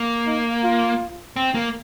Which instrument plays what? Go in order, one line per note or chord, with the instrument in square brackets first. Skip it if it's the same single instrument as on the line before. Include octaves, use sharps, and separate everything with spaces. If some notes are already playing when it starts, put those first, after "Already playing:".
Already playing: [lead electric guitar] A#3
[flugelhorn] D#4
F4
[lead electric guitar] C4
A#3